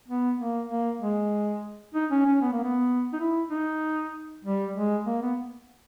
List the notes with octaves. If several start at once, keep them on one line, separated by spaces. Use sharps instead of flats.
B3
A#3
A#3
G#3
D#4
C#4
C#4
B3
A#3
B3
D#4
E4
D#4
G3
G#3
A#3
B3